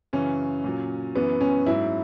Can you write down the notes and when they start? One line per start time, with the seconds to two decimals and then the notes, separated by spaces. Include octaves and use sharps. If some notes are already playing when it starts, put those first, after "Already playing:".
0.13 F#2 C#3 E3 C#4
0.64 A#2 F#3
1.15 F#2 E3 B3
1.41 C#4
1.67 G#2 F#3 E4